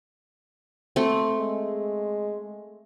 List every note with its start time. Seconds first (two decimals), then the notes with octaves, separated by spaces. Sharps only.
0.96 A3 C4
1.38 G#3